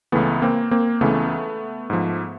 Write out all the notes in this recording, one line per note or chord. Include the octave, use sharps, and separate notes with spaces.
C#2 C#3 E3 A3 B3
A#3 C4
A#3 C4
C#2 C#3 E3 A3 B3
G#2 F3